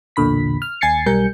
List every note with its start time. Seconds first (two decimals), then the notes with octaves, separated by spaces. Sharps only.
0.16 B1 E2 A#2 D3 B5 B6
0.62 F6
0.81 D#2 G#5 G#6 A6 C7 C#7
1.06 B1 G3 A#4 G#5 G6 C#7